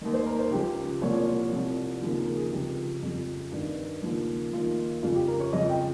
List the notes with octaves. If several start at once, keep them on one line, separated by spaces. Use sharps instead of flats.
D#2 D#3
C5
A#4
C5
C#2 C#3 F3 G4
C2 A#2 F3 C#5
C2 C3 F3
D#2 C#3 F3
G#4
A#4
G#4
C#2 C3 F3 G4
F2 C#3 F3
G2 D#3
D#2 C#3 F3
D#2 D#3 F4
F2 C#3 F3 F4
G4
A#4
C#5
F2 C#3 F3 D#5
G5